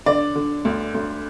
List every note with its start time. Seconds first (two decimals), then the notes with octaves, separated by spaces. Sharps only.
0.06 D3 D5
0.35 D3
0.65 D2
0.94 D2